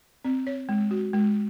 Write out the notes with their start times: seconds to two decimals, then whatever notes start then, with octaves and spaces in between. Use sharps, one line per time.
0.24 C4
0.47 C#5
0.69 G#3
0.91 F#4
1.13 G#3